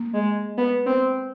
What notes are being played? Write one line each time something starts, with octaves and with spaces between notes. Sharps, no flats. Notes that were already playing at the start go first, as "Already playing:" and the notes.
Already playing: A#3
G#3
B3
C4